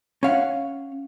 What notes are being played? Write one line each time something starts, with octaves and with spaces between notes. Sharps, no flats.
C#4 F5 F#5